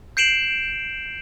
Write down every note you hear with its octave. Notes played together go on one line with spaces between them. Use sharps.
G6 C7 D7 E7 F#7